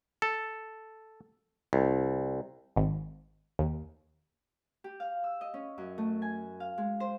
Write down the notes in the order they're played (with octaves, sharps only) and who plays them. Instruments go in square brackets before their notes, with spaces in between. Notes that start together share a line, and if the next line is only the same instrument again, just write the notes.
[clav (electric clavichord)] A4
C2
[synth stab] G#1
D#2
[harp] G4
F5
E6
D#5
C#4
F#2
A3
G#5
F5
G#3
C5